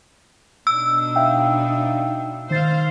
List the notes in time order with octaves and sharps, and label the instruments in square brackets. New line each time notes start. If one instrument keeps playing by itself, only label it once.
[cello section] B2 D4 D#4 [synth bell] E6
[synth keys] E5 F5 G5
[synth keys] D#3 A6 [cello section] C5 F5